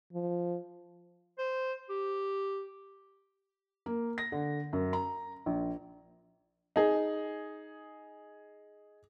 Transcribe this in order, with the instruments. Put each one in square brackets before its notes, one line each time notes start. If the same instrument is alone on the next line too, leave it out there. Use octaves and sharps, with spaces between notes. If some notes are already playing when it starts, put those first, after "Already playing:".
[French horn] F3
[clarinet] C5
G4
[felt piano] A#3
A#6
D3
F#2
A#5
A#1
[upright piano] D#4 G#4